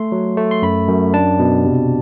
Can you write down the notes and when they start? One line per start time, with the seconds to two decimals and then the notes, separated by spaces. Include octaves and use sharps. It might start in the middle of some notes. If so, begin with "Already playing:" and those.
Already playing: A3 C6
0.12 F#3
0.37 A3
0.51 C6
0.62 F#2 B5
0.88 F#2
1.14 D4 A5
1.39 B2
1.65 C3